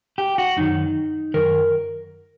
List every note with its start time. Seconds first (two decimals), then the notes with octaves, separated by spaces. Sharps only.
0.18 G4
0.38 F#4
0.57 F#2 D#3 D#4
1.34 F#2 D#3 A#4